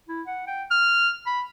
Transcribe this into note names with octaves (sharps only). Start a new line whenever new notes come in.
E4
F#5
G5
F6
B5